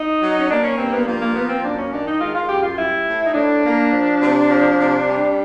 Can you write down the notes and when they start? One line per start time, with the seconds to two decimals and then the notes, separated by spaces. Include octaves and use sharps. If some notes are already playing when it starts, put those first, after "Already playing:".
Already playing: D#4
0.21 F#3
0.39 C#4
0.49 A#3 D4
0.64 C#4
0.78 G2 C4
0.93 B3
1.06 F3 A#3
1.21 A#3
1.35 A#3 B3
1.49 C4
1.63 F#2 D4
1.78 C#4
1.92 D#3 D4
2.06 D#4
2.21 G#3 F4
2.35 F4
2.48 F#2 G4
2.63 F4
2.77 G3 E4
3.05 A2
3.25 D#4
3.34 A2 D4
3.63 A#3
3.91 F3
4.19 C3
4.48 F3
4.76 C3
5.06 G3